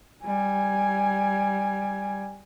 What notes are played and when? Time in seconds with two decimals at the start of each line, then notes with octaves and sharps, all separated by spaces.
0.23 G3 G#5